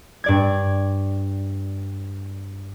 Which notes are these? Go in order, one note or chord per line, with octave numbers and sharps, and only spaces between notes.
G2 D5 G#6